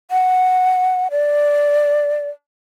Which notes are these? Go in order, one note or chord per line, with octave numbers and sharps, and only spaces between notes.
F#5
D5